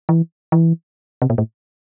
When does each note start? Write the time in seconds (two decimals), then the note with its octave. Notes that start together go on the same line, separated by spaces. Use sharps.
0.09 E3
0.52 E3
1.22 C3
1.30 A#2
1.38 A2